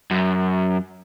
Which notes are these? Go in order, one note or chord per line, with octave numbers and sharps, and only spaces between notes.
F#2